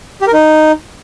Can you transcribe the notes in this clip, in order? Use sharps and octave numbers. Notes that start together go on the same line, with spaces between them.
G4
A#4
D#4